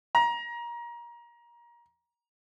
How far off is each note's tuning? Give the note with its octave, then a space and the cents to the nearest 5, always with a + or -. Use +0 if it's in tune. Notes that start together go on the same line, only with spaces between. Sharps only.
A#5 +25